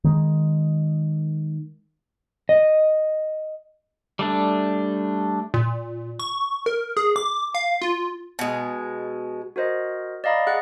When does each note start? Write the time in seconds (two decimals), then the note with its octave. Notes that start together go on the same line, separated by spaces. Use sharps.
0.04 D#3 G#3
2.49 D#5
4.19 G3 A3 D4
5.54 A#2
6.19 C#6
6.66 A#4
6.97 G#4
7.16 D6
7.55 F5
7.81 F4
8.39 B2 G#3
9.56 F#4 A#4 C5 D#5
10.24 D5 D#5 F5 A#5 B5
10.47 G#4 F#5 F#6 A6